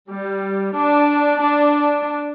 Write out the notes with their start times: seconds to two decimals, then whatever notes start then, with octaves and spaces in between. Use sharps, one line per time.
0.12 G3
0.76 D4
1.41 D4